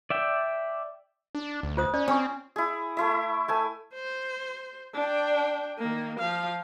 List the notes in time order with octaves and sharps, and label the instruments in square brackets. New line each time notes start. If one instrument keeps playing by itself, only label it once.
[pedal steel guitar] D5 E5 G5
[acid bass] D4
D2
[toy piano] F4 C5 D#6
[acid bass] C#4 [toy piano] D5
[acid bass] C4 [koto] C#4 [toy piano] C#6 D#6
[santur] E4 G#4
A3 E4 E5
A3 G#5 E6
[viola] C5
D4 G5
D#3 A#3
F3 F5